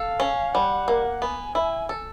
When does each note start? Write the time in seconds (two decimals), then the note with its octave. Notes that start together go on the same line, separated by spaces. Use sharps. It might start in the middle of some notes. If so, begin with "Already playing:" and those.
Already playing: A4 F5
0.20 C#4
0.53 G3 F#5
0.88 A#3
1.22 B3 G#5
1.55 E4
1.89 A4